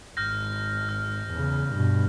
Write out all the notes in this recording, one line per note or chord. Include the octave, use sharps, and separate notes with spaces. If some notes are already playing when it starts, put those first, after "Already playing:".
G#1 F6 G6 A#6
F6
E2 C#3
G2 B2